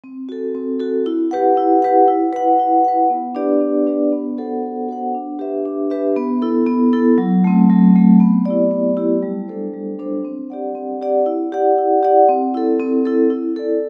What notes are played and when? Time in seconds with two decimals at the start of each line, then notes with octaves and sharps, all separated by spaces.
0.04 C4
0.29 F#4 A4
0.55 C4
0.80 F#4 A4
1.06 E4
1.31 G4 B4 F#5
1.57 E4
1.82 G4 B4 F#5
2.08 E4
2.33 B4 F#5
2.59 E4
2.84 B4 F#5
3.10 B3
3.35 D4 G4 B4 D5
3.61 B3
3.87 D4 G4 B4 D5
4.12 B3
4.38 F#4 A4 C5 F#5
4.63 B3
4.89 F#4 A4 C5 F#5
5.14 D4
5.39 G4 B4 E5
5.66 D4
5.90 G4 B4 E5
6.17 B3
6.42 E4 A4
6.67 B3
6.93 E4 A4
7.18 F#3
7.44 A3 C4
7.70 F#3
7.95 A3 C4
8.20 B3
8.45 E4 G4 D5
8.71 B3
8.97 E4 G4 D5
9.23 G3
9.48 D4 A4 C5
9.74 G3
9.99 D4 A4 C5
10.25 C4
10.50 G4 D5 F#5
10.75 C4
11.01 G4 D5 F#5
11.26 E4
11.52 G4 D5 F#5
11.78 E4
12.03 G4 D5 F#5
12.29 C4
12.54 E4 A4
12.80 C4
13.05 E4 A4
13.30 E4
13.56 A4 D5